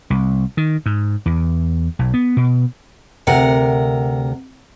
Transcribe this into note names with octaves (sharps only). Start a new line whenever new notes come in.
C2
D#3
G#2
E2
B1
B3
B2
D2 C3 A#4 F#5